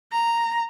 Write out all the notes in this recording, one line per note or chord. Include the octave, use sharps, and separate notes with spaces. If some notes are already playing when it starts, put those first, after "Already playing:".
A#5